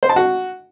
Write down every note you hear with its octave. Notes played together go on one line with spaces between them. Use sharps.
C5
A5
F#4